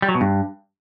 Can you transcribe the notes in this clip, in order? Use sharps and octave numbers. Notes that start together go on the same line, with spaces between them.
G3
F#3
B2
G2